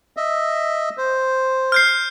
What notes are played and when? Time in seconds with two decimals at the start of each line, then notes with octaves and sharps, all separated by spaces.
0.17 D#5 E5
0.97 C5
1.72 F6 G6 C7